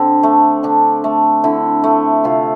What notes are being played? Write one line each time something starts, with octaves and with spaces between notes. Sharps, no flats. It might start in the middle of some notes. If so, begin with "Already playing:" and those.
Already playing: D3 C4 D4
A3
D3 D4
A3
D3 E4
A3
C3 F4